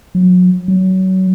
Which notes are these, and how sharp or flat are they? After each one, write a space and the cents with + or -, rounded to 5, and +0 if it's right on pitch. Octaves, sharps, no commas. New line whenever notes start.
F#3 -30
F#3 +25